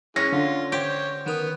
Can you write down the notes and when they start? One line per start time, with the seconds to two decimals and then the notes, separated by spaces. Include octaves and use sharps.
0.16 E3 G#3 C#4 A#6
0.32 D3 F4
0.72 G4 C5 C#5
1.26 D#3 B3 A#4 D#6